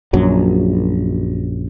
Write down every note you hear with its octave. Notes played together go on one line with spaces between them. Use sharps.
A#1 F#2 F#3